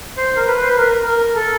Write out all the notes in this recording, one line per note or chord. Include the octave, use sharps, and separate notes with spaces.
C5
A#4
B4
C5
B4
A#4
A#4
A4